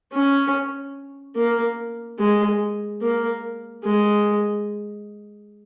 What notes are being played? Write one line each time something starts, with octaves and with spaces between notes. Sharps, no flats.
C#4
A#3
G#3
A#3
G#3